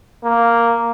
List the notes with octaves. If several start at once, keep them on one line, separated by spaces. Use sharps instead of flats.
A#3